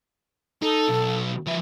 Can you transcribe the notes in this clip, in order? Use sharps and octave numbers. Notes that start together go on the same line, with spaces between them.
D#4 A4
B1
F3 B4 E5